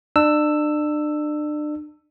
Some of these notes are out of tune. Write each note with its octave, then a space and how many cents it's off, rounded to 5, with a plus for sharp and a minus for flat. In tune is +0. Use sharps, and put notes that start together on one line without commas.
D4 +35 E6 +5